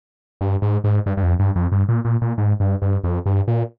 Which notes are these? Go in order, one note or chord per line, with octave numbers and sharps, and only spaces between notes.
G2
G#2
G#2
G2
G2
F2
G2
F2
G2
A#2
A#2
A#2
G#2
G2
G2
F2
G2
A#2